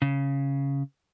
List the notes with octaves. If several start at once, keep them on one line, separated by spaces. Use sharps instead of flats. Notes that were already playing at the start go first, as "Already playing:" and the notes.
C#3